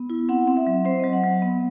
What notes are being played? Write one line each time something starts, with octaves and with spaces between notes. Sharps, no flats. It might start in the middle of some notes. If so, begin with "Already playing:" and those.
Already playing: B3
E4
C4 F#5
C4
E5
F#3
C4 C5
D#5
F#3
F#5
F#3
B3